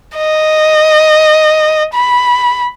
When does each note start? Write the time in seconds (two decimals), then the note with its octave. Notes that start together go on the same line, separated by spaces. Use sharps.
0.17 D#5
1.94 B5